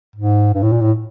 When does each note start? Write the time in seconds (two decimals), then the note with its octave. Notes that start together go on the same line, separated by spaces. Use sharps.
0.16 G#2
0.54 G2
0.63 A2
0.72 A#2
0.82 A2